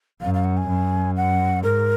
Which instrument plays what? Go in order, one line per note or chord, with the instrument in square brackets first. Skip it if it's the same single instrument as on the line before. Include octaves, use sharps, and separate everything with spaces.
[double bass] F#2 [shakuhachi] F5
[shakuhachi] F5
F#5
G#5
[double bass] F#2
[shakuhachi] F#5
[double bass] G#2 [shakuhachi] A#4